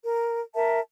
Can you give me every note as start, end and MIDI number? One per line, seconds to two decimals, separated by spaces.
0.04 0.41 70
0.54 0.80 70
0.54 0.80 76
0.54 0.80 81